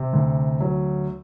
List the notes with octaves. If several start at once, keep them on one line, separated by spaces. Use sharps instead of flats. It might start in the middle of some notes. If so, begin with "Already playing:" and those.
Already playing: C3
D2
F#3